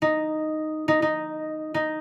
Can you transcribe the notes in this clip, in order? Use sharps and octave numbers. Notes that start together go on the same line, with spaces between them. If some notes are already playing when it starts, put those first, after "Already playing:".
D#4
D#4
D#4
D#4